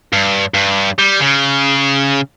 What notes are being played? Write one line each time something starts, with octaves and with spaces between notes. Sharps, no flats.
G2
G2
G3
C#3